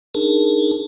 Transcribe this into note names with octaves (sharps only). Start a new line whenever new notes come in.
D4 D#4 G#4 A#4 A5